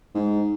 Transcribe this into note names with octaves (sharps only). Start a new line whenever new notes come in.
G#2